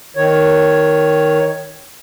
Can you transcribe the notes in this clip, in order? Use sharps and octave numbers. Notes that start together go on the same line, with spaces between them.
D#3 C#5